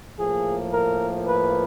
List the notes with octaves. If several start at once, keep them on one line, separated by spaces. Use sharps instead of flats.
A2 F3 A#3 G#4
A#4
B4